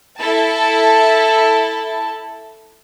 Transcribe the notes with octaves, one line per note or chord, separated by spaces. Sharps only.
E4 A4 A5